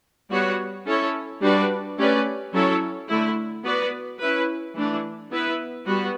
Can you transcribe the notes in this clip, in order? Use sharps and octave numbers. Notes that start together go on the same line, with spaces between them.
G3 B3 F#4 C#5
C#4 E4 A4 C#5
G3 D4 F#4 B4 D5
A3 C#4 G4 B4 D5
F#3 C#4 E4 A4 C#5
D3 A3 E4
B3 F#4 B4 D5
C#4 E4 B4
E3 A3 D4
B3 E4 B4
G3 B3 F#4